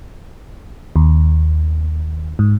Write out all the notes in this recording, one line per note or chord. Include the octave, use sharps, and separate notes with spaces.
D#2
G#2